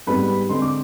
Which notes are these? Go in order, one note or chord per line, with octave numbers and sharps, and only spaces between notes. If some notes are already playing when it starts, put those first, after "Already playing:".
G#2 G3 B3 B4 B5
D3 G#3 C4 C6
D6